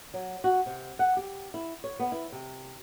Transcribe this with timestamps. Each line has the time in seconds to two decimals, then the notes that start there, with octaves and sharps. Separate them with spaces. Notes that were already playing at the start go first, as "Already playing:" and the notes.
0.14 F#3
0.44 F#4
0.66 C3
0.99 F#5
1.17 G4
1.54 E4
1.84 C#5
2.00 B3
2.12 E4
2.32 C3